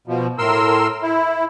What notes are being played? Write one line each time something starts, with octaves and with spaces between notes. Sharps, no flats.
B2 F3
A2 A#4 C6 E6
E4